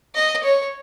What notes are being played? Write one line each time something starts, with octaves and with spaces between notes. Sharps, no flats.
D#5
C#5